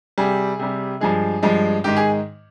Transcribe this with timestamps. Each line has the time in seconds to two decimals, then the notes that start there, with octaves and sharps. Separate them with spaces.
0.18 C3 G3 G#4
0.59 C3 G3
1.01 G2 F3 G#3 G#4
1.43 G2 F3 G#3
1.84 G#2 D#3 G#3 G4
1.97 G#4